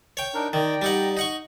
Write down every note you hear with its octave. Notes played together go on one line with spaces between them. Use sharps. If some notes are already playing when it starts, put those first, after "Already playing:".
C#5 G5
D4 D#4 A#4
D#3 D5 G5 A#5
G3 D#4 F#5
D#4 F#5 C#6